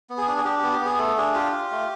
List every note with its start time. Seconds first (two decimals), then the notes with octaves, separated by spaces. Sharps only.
0.10 B3
0.18 G#4
0.28 D4
0.38 G#4
0.44 D4 G4
0.59 B3 G4
0.72 G4
0.81 B3 G#4
0.98 A3 A4
1.17 D4 G#4
1.34 F4 G4
1.52 F4
1.71 A3